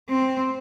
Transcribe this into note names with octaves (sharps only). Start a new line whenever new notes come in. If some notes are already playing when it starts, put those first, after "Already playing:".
C4